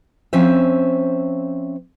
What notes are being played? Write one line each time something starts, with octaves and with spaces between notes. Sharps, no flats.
F3 C4 C#4 C5 E5